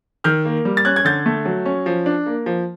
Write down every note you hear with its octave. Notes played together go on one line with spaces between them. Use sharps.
D#3 F6 G6
A#3
G3
A6
C#4 F#6 G#6
G#6
D3 G6 A6
A3
F#3
C#4
F3
D4
A#3
F3